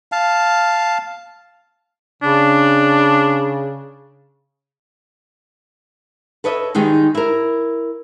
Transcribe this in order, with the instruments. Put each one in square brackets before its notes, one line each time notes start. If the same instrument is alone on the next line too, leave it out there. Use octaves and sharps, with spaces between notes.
[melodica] F5 A5
[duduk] C#3 [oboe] D4
[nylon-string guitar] A4 B4 C#5 D#5 E5
D#3 G3 G#3 D#4
E4 A#4